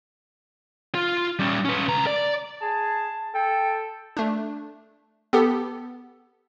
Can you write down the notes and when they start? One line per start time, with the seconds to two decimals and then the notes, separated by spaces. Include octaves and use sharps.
0.95 F4
1.39 G3 C#4
1.65 C#4 B4
1.88 C#2 A#5
2.07 D5
2.61 G#4 A5
3.34 A4 G5
4.17 A3 D4
5.33 B3 G4 A4